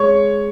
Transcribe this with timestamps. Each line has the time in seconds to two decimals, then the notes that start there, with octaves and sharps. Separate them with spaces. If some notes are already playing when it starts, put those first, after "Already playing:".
Already playing: G#3 C#5 C#6